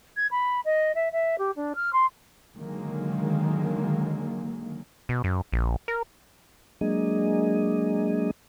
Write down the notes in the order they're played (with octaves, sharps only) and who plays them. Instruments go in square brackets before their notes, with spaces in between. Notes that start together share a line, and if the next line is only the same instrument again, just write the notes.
[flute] G#6
B5
D#5
E5
E5
G4
D4
F6
C6
[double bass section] D3 D#3 F#3 G#3 A#3
[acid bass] B2
F#2
A#1
A#4
[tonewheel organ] F#3 G#3 A#3 D4 G#4 D#5